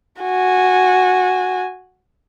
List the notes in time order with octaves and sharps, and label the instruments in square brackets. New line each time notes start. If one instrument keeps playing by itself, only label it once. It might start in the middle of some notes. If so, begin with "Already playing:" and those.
[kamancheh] F#4 G#5